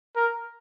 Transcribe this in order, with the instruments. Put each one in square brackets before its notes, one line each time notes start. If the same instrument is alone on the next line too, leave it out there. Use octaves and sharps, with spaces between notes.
[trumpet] A#4